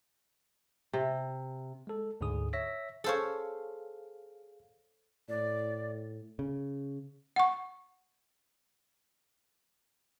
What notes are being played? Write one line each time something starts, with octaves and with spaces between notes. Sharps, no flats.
C3
G#3 A4
D2 G#2 D3 G#4 D#6
C#5 E5 E6 A#6 B6
G#4 A4 C5 C#5 F5
A2 D5
C#3
F#5 C#6